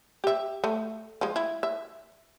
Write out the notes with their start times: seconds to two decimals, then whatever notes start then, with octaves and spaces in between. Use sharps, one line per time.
0.24 G4 E5
0.64 A3
1.21 F3 G#3
1.36 E4
1.63 E5